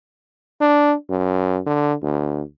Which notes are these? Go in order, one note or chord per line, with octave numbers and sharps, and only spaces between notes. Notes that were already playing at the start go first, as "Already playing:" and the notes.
D4
F#2
D3
D2